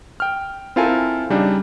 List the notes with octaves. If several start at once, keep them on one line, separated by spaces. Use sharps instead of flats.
G5 F6
C4 E4 F4 A4 A#4 G#5
C#3 G3 D4 D#4